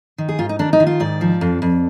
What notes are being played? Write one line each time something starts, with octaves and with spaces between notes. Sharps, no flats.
D#3
G#4
G#2 F4
D#4
D#3 D4
D#4
D#3
F4
G#2 D5
F3
F2
F2